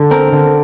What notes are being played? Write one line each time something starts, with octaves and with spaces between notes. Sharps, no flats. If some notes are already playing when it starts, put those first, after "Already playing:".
Already playing: D3
C4 A#4
D3